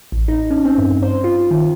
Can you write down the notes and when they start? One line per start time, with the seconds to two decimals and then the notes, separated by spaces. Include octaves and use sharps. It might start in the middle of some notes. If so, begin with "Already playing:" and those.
0.12 A1
0.28 D#4
0.51 C#4
0.65 C4
0.78 G2
1.02 C5
1.24 F4
1.51 D#3